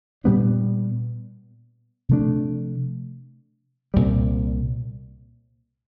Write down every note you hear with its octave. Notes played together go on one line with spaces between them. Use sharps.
A#2 G3 B3 D4
C3 F3 A3 D4
C2 A#2 G3